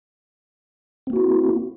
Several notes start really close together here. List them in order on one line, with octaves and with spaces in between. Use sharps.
C4 A#3 F#4 E4